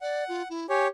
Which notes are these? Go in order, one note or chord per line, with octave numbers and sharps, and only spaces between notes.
D5 F#5
F4
E4
G4 C#5 G#5